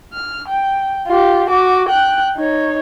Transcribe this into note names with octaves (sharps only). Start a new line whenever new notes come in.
F6
G5
F4 G4
F#4 D6
G5 F#6
D#4 C#5